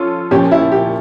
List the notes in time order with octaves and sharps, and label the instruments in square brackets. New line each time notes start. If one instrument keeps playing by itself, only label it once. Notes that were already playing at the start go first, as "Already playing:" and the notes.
Already playing: [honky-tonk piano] F3 C#4 F4 A4 C#5
[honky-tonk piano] A#2 F3 C#4 [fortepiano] G4
[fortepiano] E4
G4